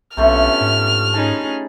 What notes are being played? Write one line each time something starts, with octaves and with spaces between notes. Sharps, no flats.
B1 C3 A3 B3 C#4 D4 F4 F6
G#2
C#4 D#4 G#4 A5 B5